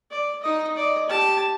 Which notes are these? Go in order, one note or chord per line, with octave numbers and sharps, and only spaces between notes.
D5
D#4 D#5
D5 D#5
G4 A5